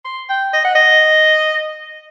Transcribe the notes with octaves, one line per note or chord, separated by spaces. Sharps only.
C6
G5
D#5
F#5
D#5